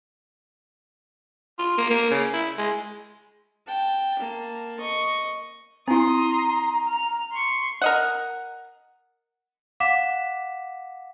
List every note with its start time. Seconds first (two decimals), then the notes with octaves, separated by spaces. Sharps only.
1.59 F4
1.78 A#3
1.90 A#3
2.11 C#3
2.33 E4
2.58 G#3
3.67 G5 A5
4.19 A#3 A5
4.80 D#5 C#6
5.88 C4 E4 A#5 C6 D#6
6.88 F6
7.32 C6 C#6
7.82 A#4 D#5 F#5
9.80 F5 F#5 D6 B6 E7